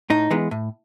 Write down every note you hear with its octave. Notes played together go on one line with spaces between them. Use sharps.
A2 D#4
E3 G#3 B3
A2